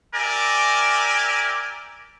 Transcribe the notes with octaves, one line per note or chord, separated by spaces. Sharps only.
G4 A#4 D5 E5 G#5